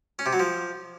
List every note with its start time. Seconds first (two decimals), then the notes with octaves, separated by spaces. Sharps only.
0.19 C#4
0.26 C3
0.33 F#3
0.40 F3